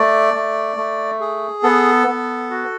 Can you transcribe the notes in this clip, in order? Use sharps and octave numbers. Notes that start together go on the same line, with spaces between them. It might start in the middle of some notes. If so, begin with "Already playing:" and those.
Already playing: A3 D5
A3
A3
G#4
B3 A4
B3
F#4